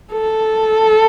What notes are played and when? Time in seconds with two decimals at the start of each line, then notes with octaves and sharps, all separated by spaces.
0.12 A4